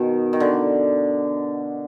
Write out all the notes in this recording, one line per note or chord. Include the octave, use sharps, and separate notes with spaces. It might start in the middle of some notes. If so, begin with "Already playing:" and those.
Already playing: B2 D#3
D#3
D3